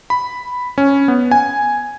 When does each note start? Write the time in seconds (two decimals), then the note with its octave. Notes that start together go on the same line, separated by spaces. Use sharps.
0.10 B5
0.78 C#4
1.08 B3
1.31 G#5